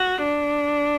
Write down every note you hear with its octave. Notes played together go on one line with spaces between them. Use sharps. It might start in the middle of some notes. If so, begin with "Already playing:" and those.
Already playing: F#4
D4